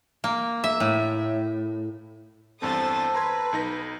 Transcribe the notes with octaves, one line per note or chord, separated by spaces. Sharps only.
A#3
E5
A2
E2 G2 C4 A4 C5 D#6 A6
B4 A#5 C6 G#6
B1 D#4 A#6